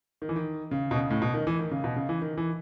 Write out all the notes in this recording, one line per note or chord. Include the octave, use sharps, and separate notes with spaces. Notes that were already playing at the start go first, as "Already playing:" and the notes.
D#3
E3
D#3
C#3
B2
C#3
A2
B2
D#3
E3
D#3
C#3
B2
C#3
E3
D#3
E3